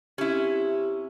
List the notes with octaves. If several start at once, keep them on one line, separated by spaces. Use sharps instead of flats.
C3 C#4 E4